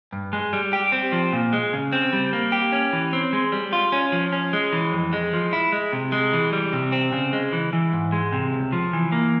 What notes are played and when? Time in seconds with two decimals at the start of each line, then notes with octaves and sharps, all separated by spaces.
0.13 G2
0.33 G#3
0.53 G3
0.73 G4
0.92 C4
1.12 F3
1.33 A#2
1.53 G#3
1.73 C#3
1.93 C4
2.13 G3
2.33 A#3
2.52 G4
2.72 C#4
2.93 E3
3.13 C4
3.33 G#3
3.52 G3
3.73 F4
3.92 C#4
4.12 F3
4.33 C#4
4.53 G#3
4.73 E3
4.92 F2
5.13 G#3
5.33 F3
5.53 E4
5.72 G#3
5.93 C3
6.12 G#3
6.33 E3
6.53 G3
6.73 C3
6.92 C4
7.12 C#3
7.33 G#3
7.53 E3
7.73 E3
7.93 G#2
8.12 G#3
8.32 C3
8.53 C#2
8.73 F3
8.93 E3
9.12 A#3